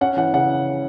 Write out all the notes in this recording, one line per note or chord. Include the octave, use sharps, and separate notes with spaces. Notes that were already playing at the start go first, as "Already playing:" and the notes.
C#4 F#5
E3 F#5
C#3 F#5